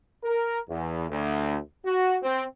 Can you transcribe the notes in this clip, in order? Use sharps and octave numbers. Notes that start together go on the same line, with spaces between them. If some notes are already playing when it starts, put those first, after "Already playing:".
A#4
E2
D2
F#4
C4